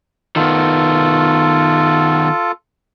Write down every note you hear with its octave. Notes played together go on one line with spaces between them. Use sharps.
D#3 B3 F4 A4